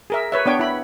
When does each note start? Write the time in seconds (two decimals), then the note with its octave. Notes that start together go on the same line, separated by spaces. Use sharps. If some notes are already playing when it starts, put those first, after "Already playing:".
0.10 G#4 A#4 E5
0.32 B4 C#5 E5
0.46 B3 D4 C#5 G5
0.59 E4 B5